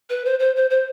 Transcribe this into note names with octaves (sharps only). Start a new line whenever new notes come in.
B4
C5
C5
C5
C5